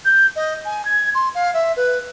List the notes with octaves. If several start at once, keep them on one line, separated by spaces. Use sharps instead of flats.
G6
D#5
G#5
G#6
C6
F5
E5
B4